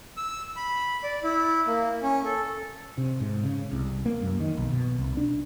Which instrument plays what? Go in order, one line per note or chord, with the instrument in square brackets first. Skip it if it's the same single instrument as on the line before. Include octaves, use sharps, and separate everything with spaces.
[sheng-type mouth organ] E6
B5
D5
E4
A#3
C#4
A4
[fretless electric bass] C3
G#2
C#3
C2
A#3
F#2
D#3
B1
B2
C2
D4